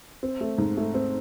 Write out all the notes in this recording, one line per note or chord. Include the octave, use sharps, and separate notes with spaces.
C4
A3
G#2
A3
C4